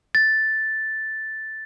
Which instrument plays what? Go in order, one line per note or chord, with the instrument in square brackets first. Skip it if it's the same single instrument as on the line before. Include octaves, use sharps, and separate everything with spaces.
[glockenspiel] A6